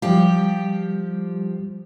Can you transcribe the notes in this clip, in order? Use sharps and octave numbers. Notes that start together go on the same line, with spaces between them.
F3 G3 G4